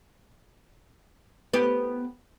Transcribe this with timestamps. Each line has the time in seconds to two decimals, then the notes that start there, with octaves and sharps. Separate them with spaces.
1.53 B3 G4